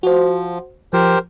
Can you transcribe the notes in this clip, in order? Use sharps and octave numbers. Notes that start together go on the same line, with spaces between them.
F3 F#4 C5
F3 G4 A#4 C5